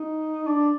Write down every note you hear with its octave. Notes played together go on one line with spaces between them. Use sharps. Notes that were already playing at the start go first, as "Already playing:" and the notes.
Already playing: D#4
D4